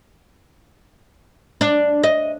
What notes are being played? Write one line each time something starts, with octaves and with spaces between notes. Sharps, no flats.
D4
D#5